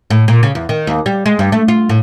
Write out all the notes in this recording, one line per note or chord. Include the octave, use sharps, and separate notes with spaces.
A2
A#2
C#3
E2
D#3
D#2
G3
G#3
G2
A3
F4
A2